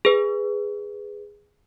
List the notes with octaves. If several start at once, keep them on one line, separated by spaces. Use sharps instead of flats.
G#4 B4